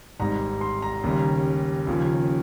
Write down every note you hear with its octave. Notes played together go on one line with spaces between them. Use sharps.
G#1 G#2 G3 A#5
C6
A#5
D#2 C#3 G3
D#2 C#3 F3